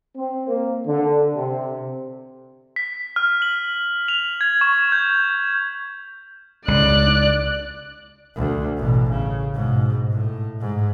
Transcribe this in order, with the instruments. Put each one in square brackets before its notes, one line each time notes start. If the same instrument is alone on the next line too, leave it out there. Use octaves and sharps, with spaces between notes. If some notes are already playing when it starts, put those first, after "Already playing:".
[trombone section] C4
A#3
D3
C3
[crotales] B6
F6
F#7
F7
G#6
C#6
G6
[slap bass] C#2 [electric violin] D5 F#6
[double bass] D2
A1 B2
C#3
G#2 B2
A2
G#2